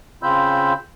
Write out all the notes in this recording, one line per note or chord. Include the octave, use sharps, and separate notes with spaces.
C#3 C4 F4 B5 E6 G6